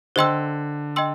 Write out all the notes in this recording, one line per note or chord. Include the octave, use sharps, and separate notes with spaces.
D3 C5 D#5 G5 C6 E6
D#5 G5 C6 E6